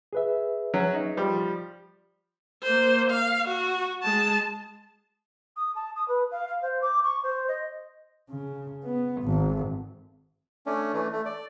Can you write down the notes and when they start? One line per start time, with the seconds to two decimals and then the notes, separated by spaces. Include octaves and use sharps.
0.13 G#4 B4 E5
0.74 F#3 C#4 F#4
0.94 D#4
1.17 F3 G3
2.63 A#3 C5
3.11 F5
3.48 F#4
4.03 G#3 A5
5.57 D#6
5.75 A5
5.96 D#6
6.08 B4
6.31 F5
6.48 F5
6.62 C5
6.82 D6
7.04 C#6
7.23 C5
7.48 D#5
8.30 C#3
8.84 B3
9.23 G#1
10.66 A3 C#4 D4
10.93 E3 A3
11.13 A3
11.25 D5